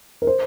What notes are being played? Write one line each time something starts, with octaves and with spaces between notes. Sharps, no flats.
A#4
C5